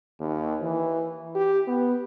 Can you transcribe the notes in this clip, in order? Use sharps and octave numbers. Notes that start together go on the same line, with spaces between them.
D#2
E3
G4
B3